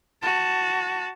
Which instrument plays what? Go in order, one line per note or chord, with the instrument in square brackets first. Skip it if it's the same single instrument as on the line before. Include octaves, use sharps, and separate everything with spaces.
[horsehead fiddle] F#4 A5